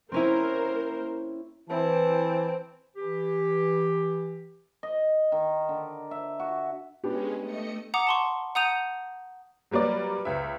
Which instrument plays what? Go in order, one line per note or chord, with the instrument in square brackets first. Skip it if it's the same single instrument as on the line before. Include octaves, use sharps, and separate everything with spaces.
[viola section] A#3 A#4 C5 [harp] C4 C#4 E4
[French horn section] E3 [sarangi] C4 [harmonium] E4 A5
[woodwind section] E3 G4
[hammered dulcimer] D#5
D#3
D3
E5
F#4
[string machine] G#3 C#4 [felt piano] B3 D4 G4
[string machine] A3 D#5 C#7
[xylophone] F#5 A#5 D6 D#6 C#7
A5 C6 C#6
F#5 A#5 D#6 G6 D#7 F7
[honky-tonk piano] F#3 G3 A#3 B4 D5
C#2 B4 E5